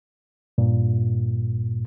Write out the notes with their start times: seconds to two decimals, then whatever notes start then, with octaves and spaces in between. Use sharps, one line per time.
0.58 G2 A#2